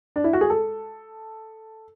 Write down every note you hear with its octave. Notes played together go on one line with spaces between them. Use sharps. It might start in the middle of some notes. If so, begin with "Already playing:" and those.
D4
E4
F#4
G#4
A4